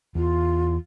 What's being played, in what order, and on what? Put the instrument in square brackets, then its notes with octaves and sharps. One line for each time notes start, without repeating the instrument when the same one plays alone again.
[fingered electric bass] E2 [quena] F4